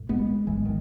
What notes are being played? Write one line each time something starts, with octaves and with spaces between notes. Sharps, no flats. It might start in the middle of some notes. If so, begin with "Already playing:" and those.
Already playing: B1 A2
G#3 B3
G#1 G#2 E3 G#3
D#3